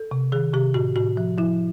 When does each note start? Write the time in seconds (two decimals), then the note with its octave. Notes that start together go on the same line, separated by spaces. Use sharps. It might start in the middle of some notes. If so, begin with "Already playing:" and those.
Already playing: A4
0.11 C3
0.32 D#3 G#4
0.54 C3 G4
0.74 A2 F#4
0.96 A2 F#4
1.17 F3
1.38 F3 E4